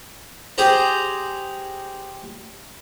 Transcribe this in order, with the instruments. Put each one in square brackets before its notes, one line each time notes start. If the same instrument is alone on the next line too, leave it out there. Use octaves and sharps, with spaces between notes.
[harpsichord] G4 G#4 C5 A#5